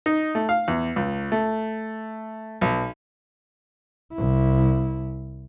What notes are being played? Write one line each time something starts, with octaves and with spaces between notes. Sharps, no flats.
D#4
A3
F5
E2
C#2
A3
B1
C2 E4